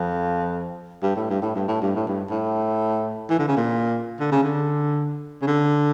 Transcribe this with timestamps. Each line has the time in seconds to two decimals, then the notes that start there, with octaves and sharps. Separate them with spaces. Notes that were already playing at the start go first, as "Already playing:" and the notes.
Already playing: F2
1.03 G2
1.16 A2
1.30 G2
1.42 A2
1.56 G2
1.68 A2
1.82 G2
1.96 A2
2.08 G2
2.30 A2
3.30 E3
3.39 D3
3.48 C#3
3.56 A#2
4.20 D3
4.32 C#3
4.43 D3
5.42 C#3
5.47 D3